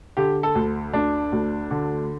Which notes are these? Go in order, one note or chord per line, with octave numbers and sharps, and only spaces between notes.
D3 G4
A4
D2
D2 D4
D2
D3